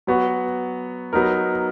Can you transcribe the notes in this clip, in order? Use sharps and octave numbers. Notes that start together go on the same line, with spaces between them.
F#3 B3 F#4
F#3 B3 D#4 A#4